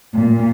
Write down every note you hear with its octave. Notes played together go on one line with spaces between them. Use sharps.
A#2